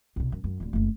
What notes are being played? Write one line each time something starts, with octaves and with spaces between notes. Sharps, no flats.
C2 B2
F#2
F#2
D1 D3
F#1 A3